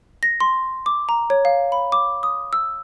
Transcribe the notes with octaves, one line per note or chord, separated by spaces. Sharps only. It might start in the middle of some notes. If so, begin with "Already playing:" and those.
A#6
C6
D6
A#5
C#5
F5
B5
D6
D#6
E6